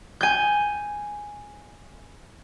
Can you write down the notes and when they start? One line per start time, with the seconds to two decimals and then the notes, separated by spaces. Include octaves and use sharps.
0.21 G#5 G6